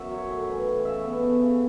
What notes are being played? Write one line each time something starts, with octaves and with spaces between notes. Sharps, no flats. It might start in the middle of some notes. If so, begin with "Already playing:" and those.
Already playing: F#2 C#4 E5 F#5
F#3 C#5
A2
E3
A2
C#3 E5
B3
A3
C#3